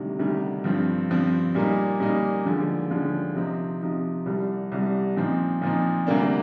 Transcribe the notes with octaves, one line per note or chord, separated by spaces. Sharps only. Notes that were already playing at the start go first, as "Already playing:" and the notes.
Already playing: D2 C3 D#3 G3
D2 C3 D#3 G3
G2 F3 C4
G2 F3 C4
A#2 G3 A#3 D#4
A#2 G3 A#3 D#4
D#2 D3 F3 G#3
D#2 D3 F3 G#3
C3 F3 C4 D#4
C3 F3 C4 D#4
C2 C3 G3
C2 C3 G3
A#2 F3 C4 D#4
A#2 F3 C4 D#4
D2 C3 G3 A#3 D4